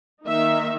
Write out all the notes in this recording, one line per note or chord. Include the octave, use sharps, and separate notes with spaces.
D#3 A#3 D#4 E5